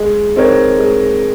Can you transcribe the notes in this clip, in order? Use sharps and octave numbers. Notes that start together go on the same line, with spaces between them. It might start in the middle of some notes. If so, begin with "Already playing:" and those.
Already playing: G#3
C4 D#4 A#4 C#5
G#3